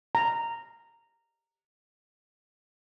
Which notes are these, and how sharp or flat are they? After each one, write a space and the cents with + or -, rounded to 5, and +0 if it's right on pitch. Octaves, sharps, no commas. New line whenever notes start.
A#5 -10